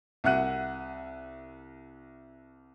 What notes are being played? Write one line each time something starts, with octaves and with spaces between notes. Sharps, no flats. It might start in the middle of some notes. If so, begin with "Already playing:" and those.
C2 E5 F#5 F#6 D#7